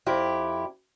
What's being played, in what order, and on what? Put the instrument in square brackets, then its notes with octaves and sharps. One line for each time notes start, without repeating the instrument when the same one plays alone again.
[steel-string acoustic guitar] F2 E4 G4